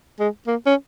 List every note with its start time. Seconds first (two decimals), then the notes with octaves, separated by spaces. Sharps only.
0.20 G#3
0.47 A#3
0.66 C#4